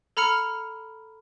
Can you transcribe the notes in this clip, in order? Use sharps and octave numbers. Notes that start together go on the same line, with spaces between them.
A4 A#5 B5 F6 C#7 F7